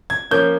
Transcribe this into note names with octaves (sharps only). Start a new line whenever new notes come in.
G#6
F3 A#3 C#4 G6